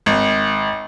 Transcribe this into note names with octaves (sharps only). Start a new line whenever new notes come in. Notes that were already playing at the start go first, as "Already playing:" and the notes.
G#1